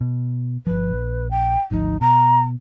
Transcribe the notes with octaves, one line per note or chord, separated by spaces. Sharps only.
B2
G1 F3 B4
A#1
G5
G#1 D2 F3 D#4
B2 A#5